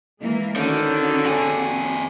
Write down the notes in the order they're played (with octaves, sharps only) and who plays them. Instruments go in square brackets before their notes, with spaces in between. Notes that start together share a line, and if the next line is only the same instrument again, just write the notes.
[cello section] E3 G#3 A#3
[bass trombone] D3 [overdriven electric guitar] D#3 [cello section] C#4 F#4
[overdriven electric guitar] F2 G#4